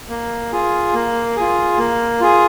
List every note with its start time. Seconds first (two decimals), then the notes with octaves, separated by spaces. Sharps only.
0.09 A#3
0.52 F4 G#4
0.94 A#3
1.36 F4 G#4
1.78 A#3
2.20 F4 G#4